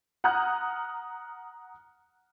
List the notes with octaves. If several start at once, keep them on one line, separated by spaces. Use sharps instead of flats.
F#5 A#5 D#6 F6 F#6